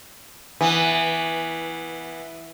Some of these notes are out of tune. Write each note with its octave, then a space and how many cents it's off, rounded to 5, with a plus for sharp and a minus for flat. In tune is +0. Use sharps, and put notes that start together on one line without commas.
E3 +0 B3 -10